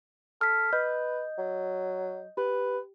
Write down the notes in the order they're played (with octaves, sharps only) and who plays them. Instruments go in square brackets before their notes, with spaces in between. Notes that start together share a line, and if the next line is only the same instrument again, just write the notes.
[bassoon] A4 [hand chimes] F6 B6
[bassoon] B4 [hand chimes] D#5 G6
[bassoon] F#3
[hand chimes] G4 [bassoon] B4